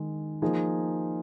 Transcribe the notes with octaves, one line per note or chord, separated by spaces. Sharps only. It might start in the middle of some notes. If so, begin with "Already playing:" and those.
Already playing: D#3 G#3
F3 A#3 D#4 G#4